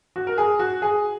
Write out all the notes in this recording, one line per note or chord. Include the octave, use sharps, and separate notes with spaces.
F#4
A#4
G#4
F#4
G#4